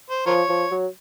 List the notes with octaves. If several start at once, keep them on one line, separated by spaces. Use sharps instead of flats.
C5
F3 F4 A#4 C#5
F3
F#3